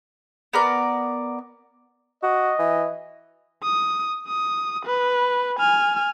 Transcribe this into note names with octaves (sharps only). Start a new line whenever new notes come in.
B3 A#4 D5
F#4 D#5
E3
D#6
D#6
B4
G#5 F6